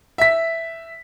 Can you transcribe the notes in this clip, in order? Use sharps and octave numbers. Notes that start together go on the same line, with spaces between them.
E5 B6